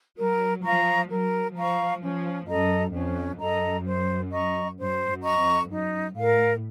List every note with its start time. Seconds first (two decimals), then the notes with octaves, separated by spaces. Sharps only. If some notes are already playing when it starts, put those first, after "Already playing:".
0.17 F#3 A#4
0.63 F3 F5 A#5 C#6
1.10 F#3 A#4
1.56 F3 F5 A#5 C#6
2.01 F3 C#4
2.48 F#2 A4 D#5 A#5
2.93 F2 C#4
3.39 F#2 A4 D#5 A#5
3.85 C5
4.31 D#5 A#5 C#6
4.77 F#2 C5
5.07 F#2
5.23 D#5 A#5 C#6
5.38 F2
5.70 F#2 D#4
6.15 A2 A#4 F5